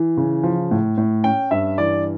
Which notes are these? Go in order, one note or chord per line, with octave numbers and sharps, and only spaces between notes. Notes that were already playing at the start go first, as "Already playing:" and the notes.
Already playing: E3
C#3
F3
A2
A2
C#4 G5
G2 E5
E3 D5